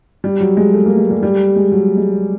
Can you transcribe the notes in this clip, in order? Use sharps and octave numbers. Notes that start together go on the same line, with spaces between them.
G3
F#3
G#3
A3
A#3
G#3
G3
G3
G#3
F#3
G#3